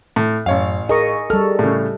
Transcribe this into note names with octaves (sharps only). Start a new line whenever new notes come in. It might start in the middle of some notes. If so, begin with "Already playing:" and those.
A2
A1 F#2 C#5 F5
G#4 A#4 D#5 C#6
G3 A4 F6
A2 C#3